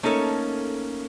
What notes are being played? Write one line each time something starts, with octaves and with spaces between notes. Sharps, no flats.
A3 A#3 C#4 D#4 A4 C#5